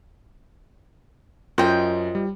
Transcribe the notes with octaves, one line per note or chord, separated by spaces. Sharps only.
F#2 F4 C5 D#5 G5
G3